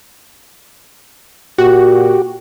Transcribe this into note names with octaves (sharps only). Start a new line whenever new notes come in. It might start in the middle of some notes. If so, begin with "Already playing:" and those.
A#2 F#4 G4